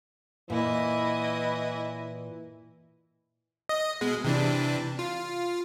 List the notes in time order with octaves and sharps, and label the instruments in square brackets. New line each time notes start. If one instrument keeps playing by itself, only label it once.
[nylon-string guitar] A#2 [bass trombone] E3 [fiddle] E4 D#5
[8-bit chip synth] D#5
B2 G#3
C3 E3 D4
F4